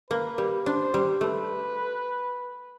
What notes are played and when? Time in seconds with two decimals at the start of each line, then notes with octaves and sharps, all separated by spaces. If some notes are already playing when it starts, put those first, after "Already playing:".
0.10 A#3 B4
0.38 G3
0.66 D4 C5
0.94 G3
1.21 A3 B4